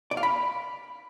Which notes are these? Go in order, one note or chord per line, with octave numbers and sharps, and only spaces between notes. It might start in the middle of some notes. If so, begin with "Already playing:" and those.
D5
F5
B5